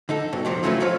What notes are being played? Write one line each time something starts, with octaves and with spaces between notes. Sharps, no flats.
D3 D#4 A4
G2 B2
F2 C3 D#3 F3
C#3 F#3 A3 E4 F4 B4
D#2 F3 F4 B4 C#5